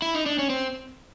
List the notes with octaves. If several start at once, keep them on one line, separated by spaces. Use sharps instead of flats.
E4
D#4
D4
C#4
C4